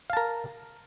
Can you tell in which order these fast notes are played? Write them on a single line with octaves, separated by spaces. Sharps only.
F5 A5 A#4